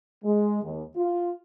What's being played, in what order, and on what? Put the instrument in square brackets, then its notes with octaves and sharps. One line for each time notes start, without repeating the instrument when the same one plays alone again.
[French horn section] G#3
D#2
F4